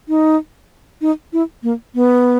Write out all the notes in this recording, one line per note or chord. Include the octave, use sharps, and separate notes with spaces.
D#4
D#4
E4
A#3
B3